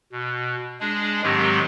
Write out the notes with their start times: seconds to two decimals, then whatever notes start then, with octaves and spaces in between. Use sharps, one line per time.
0.12 B2
0.80 G#3 D4 G#4
1.23 G#2 D#3 F#3 G#3 C4 G4